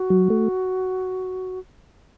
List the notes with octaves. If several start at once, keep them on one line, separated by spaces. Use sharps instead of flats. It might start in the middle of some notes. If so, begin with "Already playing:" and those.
Already playing: F#4
F#3
A3